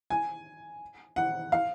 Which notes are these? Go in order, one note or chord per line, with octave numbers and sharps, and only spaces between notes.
G#5
F#5
F5